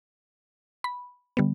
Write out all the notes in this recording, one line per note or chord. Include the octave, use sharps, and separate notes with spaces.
B5
D3 G3 B3